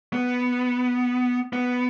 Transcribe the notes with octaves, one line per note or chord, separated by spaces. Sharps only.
B3
B3